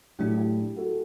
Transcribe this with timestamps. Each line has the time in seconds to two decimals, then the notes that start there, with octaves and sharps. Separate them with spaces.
0.19 A2 F#3 A3 D4 E4 G4
0.37 E4 G4
0.76 F#4 A4